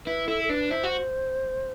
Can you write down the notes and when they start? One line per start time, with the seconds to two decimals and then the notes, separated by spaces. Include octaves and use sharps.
0.06 E4 B4
0.27 E4 A4
0.44 A4
0.49 D4 B4
0.70 E4 C5
0.84 F#4